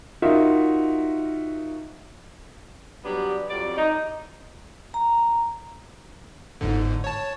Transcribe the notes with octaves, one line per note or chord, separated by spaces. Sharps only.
D#4 F4 F#4 A#4 E5
F#3 G3 B3 D4 G4
F2 F#3 G3 D5
D#4
A#5
G1 G#2 D3
C#5 A5